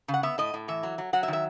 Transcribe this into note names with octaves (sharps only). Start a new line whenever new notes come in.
C#3
F#5
B3 E5
A2 D#5
A2
E3 E5
F#3
F#3
F#3 F#5
E5
D#3
E5